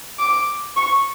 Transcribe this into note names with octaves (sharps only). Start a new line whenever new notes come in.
D6
C#6